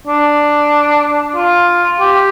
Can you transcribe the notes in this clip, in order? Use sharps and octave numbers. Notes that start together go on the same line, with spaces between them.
D4
F4
G4